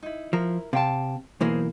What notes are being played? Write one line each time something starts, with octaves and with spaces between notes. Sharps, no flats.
D#4 E4
F3 E4 A#4
C3 F5 G5 A5
B1 E3 A#3 G#4 C5